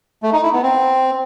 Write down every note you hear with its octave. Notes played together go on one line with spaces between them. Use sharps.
A3
D#4
E4
B3
C4